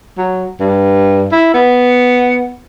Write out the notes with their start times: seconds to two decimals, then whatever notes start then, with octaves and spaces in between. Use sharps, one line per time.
0.18 F#3
0.60 G2
1.32 E4
1.54 B3